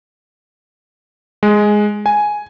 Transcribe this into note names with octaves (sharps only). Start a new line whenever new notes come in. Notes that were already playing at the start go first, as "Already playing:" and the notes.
G#3
G#5